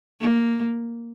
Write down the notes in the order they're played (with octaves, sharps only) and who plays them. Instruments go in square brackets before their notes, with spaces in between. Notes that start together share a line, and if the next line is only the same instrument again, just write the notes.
[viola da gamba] A#3